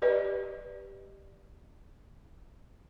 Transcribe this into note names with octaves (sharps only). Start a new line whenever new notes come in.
G4 B4 D5 D#5